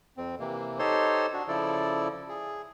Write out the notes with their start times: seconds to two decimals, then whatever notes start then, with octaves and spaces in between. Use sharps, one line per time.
0.17 F2 C4
0.39 C3 E3 A#3
0.79 D#4 G4 A4 C5 C#5 C6
1.33 D4 F#4
1.48 C#3 F3 E4 A4 D5
2.29 G#4